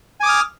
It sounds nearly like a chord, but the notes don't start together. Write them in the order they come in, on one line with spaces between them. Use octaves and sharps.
G#5 D6 D#6 F6